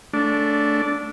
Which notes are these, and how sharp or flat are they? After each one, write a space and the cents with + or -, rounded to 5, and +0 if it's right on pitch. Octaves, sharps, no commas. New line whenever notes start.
A3 +0 D4 -15